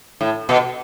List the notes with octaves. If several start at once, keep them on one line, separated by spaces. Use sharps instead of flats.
A2
B2